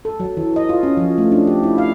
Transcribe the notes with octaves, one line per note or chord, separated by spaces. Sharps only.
A4
F#3
E3
D#5
F4
C#4
F3
A3
D4
G4
E4
F5